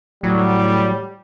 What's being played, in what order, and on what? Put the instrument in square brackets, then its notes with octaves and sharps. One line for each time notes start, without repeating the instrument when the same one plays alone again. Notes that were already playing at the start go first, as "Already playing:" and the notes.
[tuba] A2 [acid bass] F#3 [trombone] G3